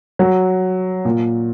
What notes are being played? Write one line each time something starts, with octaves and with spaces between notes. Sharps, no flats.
F#3
A#2